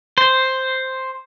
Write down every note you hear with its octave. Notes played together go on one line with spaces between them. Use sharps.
C5